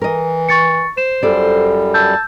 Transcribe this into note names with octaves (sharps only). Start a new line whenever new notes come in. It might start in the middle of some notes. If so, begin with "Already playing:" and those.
E3 A#4 D#5
C#6 A6 C#7
C5 E7
F#2 G3 F4 A4 D5
A5 E6 G6